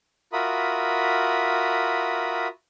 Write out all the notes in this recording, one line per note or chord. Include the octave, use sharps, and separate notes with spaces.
F4 F#4 A#4 E5 B5 D#6